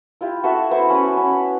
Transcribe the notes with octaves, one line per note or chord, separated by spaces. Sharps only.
E4 F4 G4
F#4 A4 E5 F#5
B3 E4 C5 C#6
C#4 B4
C#4
B5